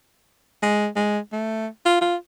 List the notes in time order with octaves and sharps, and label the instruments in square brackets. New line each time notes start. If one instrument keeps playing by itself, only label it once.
[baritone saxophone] G#3
G#3
A3
F4
F4